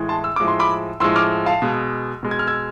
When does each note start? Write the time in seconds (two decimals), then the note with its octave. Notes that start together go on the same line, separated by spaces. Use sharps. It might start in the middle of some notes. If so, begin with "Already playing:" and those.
Already playing: A2 E3 G#3
0.09 A5 C6
0.24 E6
0.36 A2 F3 G#3 D6
0.48 C6
0.59 B5 D6
1.00 A2 F3 G#3 C6 E6
1.16 D6 F6
1.46 F5 A5
1.62 B2 G#3
2.23 B2 G#3
2.31 G#6
2.39 F6
2.47 E6 G#6